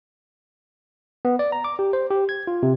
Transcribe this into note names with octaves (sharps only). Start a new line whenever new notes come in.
B3
D5
A#5
D6
G4
C5
G4
G#6
F4
C3